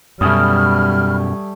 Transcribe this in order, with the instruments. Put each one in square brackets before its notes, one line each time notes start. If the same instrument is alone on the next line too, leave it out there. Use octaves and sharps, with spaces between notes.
[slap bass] F#2 B2 [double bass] G3 [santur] A3 G#5 D#6 [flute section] B5 F6